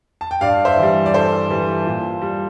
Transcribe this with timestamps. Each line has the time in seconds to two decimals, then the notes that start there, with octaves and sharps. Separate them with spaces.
0.21 A5
0.31 G5
0.41 G2 D5 F5
0.65 C5 E5
0.77 E3
0.83 G3
1.06 D5
1.14 G2 A4 C5
1.50 E3 G3
1.86 A#2
2.22 G3